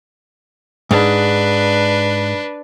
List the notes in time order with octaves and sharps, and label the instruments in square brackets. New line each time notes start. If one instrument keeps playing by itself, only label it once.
[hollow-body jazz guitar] G#2 [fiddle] D4 B4